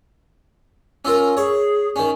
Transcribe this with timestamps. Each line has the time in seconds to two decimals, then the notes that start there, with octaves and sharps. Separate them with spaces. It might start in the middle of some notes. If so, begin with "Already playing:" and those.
1.05 C#4 F4 A#4 E6
1.37 G#4 C#5
1.96 D#3 C#4